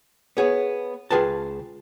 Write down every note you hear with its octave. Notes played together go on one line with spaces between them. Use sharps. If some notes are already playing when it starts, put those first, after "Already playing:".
B3 G#4 C#5
C#2 F4 G#4 B4 G5 A5